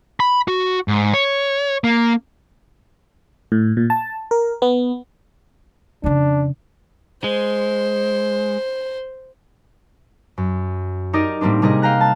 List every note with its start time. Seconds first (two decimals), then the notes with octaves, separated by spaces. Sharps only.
0.20 B5
0.48 F#4
0.88 G#2
1.14 C#5
1.84 A#3
3.52 A2
3.77 A#2
3.90 A5
4.31 A#4
4.62 B3
6.04 F2 C#3 D4
7.24 G#3 C5
10.38 F#2
11.13 D#4 G4 A#4 D5 D#5
11.41 A2 G3 A#3 C4 D4
11.62 C3 G3 G#4 A#4 D#5
11.82 F5 G5 A#5 F#6
12.01 A5